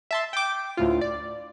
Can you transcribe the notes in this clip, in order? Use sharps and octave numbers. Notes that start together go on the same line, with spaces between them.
E5 A5 C6
G5 D6
D2 A2 F4
D5